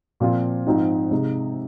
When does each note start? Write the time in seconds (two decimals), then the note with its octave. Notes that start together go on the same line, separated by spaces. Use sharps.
0.20 A#2 F3 C4 F4
0.67 G#2 F3 C4 D#4
1.11 C3 G#3 D#4